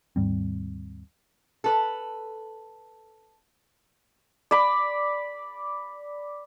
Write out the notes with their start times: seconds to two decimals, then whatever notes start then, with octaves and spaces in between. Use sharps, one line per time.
0.16 D#2 G#2 G3 C4
1.64 A4 B4
4.51 D5 B5